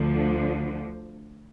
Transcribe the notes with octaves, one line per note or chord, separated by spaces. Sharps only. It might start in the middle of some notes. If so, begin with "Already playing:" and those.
Already playing: D2 D3 F3